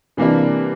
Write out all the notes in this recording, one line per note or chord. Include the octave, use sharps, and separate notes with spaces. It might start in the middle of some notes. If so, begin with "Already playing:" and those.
C3 E3 G3 A#3 D4